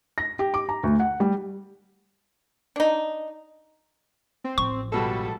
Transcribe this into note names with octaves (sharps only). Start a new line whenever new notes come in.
A#6
G4
D6
A#5
D2
F#5
G3
D4 D#4
C4
A1 F3 C#6
C#2 B2 G3 A4